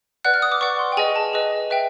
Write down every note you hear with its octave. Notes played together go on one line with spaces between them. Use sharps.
B4 D5 F#5 F#6
F6
D#6
D6
B4 D5 F#5 C#6
C6
G5
G#4 B4 D#5 G#5
A5
G#4 B4 D#5
B4 E5 G5